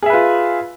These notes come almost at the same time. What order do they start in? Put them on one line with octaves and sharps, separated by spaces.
G#4 E5 B4 F4